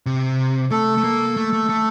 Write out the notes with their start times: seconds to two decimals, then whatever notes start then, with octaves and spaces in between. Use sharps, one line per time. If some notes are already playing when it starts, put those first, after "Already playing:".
0.06 C3
0.71 A3 A4
0.98 A3
1.04 A#3
1.37 A3
1.53 A3
1.69 A3